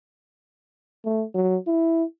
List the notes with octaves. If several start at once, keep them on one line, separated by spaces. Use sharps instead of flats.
A3
F#3
E4